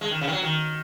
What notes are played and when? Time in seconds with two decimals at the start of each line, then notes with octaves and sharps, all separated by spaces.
0.01 G#3
0.11 D#3
0.21 C#3
0.27 D#3
0.32 F#3
0.43 D#3